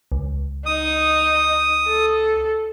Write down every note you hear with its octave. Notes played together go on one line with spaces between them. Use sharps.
C#2
D#4 D#6
A4